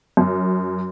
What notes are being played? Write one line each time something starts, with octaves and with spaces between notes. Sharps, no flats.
F#2